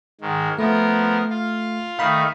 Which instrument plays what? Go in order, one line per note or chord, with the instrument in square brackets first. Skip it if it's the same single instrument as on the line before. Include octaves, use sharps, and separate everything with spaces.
[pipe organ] G#2 D#3
[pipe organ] F3 B3 A#4 [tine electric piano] A3
[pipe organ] F4 F5
[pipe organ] D#3 A3 D#4 [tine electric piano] F5 B5